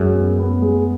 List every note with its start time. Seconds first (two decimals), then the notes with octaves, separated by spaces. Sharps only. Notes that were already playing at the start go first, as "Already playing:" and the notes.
Already playing: F#2 G#3
0.15 B3
0.39 B3
0.62 G#3